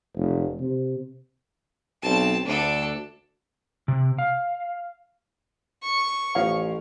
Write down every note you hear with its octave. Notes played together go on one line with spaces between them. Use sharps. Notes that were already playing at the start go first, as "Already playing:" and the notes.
F1
C3
B1 C4 A5
D2 D4 A4
C3
F5
C#6
A1 F3 C#5 F5